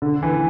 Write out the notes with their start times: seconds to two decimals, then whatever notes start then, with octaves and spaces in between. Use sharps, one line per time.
0.02 D3
0.23 E3